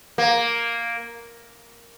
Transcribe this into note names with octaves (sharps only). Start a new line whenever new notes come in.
A#3